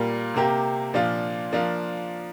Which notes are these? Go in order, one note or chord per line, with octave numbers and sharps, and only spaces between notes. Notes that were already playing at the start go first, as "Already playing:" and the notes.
Already playing: A#2 G3 A#3
C3 A#3 G4
A#2 F3 D4 F4
F3 A#3 D4 F4